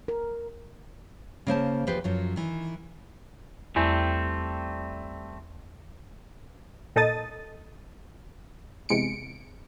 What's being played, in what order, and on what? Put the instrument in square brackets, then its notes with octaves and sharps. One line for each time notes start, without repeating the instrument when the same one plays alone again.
[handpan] A#4
[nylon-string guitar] C#3 A#3 C5 A5
E2 F3 G4 B4 C5
F#2 F3 F#3
D#3 E3
[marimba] E2 [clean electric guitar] G3 A3 C4
[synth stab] A#2 D#4 A4 D#6 A6
E2 C3 G#3 C#7 D7